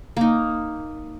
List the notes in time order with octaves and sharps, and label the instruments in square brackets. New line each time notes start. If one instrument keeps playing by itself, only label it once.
[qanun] A#3 D#4